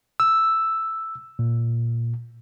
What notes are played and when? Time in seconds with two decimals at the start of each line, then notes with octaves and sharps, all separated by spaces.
0.20 E6
1.39 A#2